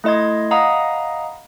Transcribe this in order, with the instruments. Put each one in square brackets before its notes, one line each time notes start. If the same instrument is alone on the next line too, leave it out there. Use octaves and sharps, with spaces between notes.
[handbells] A3 E4 D#5 C6 G#6
D#5 F5 F#5 A#5 B5 D#6